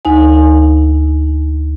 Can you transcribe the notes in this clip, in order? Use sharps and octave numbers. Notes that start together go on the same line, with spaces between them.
D2 D#4 G#5